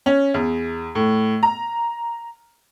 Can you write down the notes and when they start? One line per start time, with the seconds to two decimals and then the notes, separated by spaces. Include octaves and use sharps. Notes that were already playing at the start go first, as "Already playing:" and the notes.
0.06 C#4
0.34 E2
0.95 A2
1.43 A#5